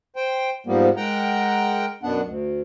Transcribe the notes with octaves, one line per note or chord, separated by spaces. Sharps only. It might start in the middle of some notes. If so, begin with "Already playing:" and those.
C5 G5
G#2 F3 G3 A#3 B3
G#3 A#4 F#5 G5 A#5
F#2 B2 B3 D4 F#5
D2